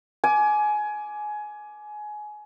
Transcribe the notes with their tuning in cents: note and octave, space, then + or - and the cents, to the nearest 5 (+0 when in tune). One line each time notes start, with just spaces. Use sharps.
G#5 +20 D6 +0